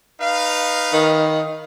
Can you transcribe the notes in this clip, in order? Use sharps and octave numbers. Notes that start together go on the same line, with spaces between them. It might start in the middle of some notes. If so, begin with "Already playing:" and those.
D#4 B4 F5
D#3